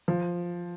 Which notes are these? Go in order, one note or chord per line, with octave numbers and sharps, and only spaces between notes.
F3